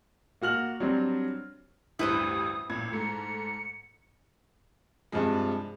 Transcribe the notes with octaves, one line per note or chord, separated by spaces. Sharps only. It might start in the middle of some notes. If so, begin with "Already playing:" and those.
A#3 F#4 F6 F#7
F#3 G3 C4 D4
A1 D2 G2 E4 B4 C5 D#6
A1 A#2 G#6
G#2 A3 C#7
G2 C3 F3 G#3